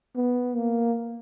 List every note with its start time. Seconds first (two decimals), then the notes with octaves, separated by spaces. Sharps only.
0.15 B3
0.56 A#3